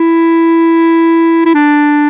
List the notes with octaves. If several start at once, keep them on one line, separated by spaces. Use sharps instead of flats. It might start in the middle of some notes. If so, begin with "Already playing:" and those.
Already playing: E4
E4
D4